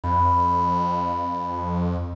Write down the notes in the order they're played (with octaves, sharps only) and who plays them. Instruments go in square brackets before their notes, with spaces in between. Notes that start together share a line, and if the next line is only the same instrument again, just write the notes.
[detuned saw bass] F2 [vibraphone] B5